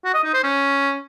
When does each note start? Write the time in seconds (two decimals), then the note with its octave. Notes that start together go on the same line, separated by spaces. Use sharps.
0.05 F#4
0.14 D#5
0.24 D#4
0.34 C5
0.43 C#4